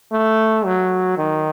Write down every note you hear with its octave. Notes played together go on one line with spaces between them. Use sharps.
A3
F#3
D#3